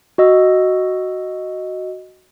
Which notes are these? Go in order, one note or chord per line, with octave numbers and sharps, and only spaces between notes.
F#4 D#5 E6